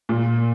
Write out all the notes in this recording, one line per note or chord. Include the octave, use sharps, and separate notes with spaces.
A#2